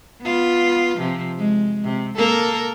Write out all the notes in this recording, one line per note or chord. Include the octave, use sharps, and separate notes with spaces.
B3 F4
C3 F3
G#3
C3
A#3 A4 A#4